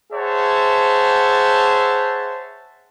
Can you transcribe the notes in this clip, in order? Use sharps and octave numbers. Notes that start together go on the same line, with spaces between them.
G#4 C5 C#5 E5 F#5 A5